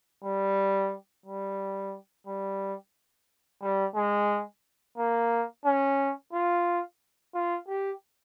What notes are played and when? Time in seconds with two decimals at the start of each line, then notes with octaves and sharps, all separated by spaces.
0.25 G3
1.26 G3
2.27 G3
3.63 G3
3.96 G#3
4.98 A#3
5.65 C#4
6.33 F4
7.34 F4
7.68 G4